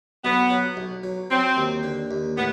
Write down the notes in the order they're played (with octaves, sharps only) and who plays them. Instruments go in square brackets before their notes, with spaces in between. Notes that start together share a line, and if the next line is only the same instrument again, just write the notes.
[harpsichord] B1 [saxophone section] B3
[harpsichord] F#3
B1
F#3
[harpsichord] F#3 [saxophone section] C4
[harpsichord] D#2
D3
D#2
[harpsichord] A2 [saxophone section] B3